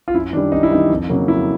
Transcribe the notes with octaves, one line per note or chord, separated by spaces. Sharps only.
F4
F#2 E4
D#3 G3 D4
F#2 D#4
E4
D#3 G3 D#4
F2
C#3 F#3 A#3
F2 E4